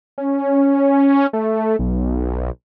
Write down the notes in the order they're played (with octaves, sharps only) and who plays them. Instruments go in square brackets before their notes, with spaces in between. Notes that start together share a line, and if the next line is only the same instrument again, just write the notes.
[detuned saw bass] C#4
A3
B1